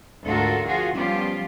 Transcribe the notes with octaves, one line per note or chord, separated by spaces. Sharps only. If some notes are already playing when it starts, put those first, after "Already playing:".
D2 G#2 F4 F#4 A4 A#4
F3 F4 F#4 G#4
F3 G3 B3 C#4 F4 G4